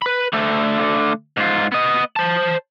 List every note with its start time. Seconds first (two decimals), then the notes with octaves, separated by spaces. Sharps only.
0.02 B4 B5
0.33 D3 A3
1.37 G#2 F4
1.72 B3 D#5
2.16 C5 A5